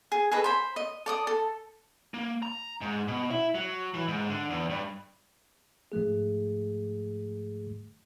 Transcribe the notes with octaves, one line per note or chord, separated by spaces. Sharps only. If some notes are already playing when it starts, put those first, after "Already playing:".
G#4
G#4 A4 B4 D#5
C5 B5
D#5
A4 D5 D#6
A4
A#3
A#5
G#2
B2
E4
F#3
E3
G#2
D3
E2
G2
G#2 F3 A3 G#4